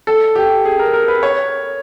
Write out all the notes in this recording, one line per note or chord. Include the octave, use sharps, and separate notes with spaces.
A4
G4
G#4
A#4
A#4
B4
C#5